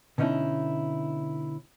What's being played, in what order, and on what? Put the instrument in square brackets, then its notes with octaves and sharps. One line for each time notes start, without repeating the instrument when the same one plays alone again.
[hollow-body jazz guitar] B2 D3 C#4 D#4 E4